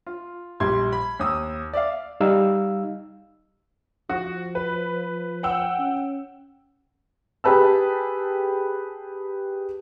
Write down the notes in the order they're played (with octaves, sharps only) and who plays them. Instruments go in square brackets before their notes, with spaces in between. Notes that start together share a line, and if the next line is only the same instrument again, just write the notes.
[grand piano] F4
A#1 G3 C6 G#6
B5
D#2 D#6 E6
D5 E5 F5
[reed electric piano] G3 D#4 F5 E6
[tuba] F3 [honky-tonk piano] F#4
[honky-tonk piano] B4
F#5 G5 E6
[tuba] C#4
[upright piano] G4 G#4 B4 A5 E6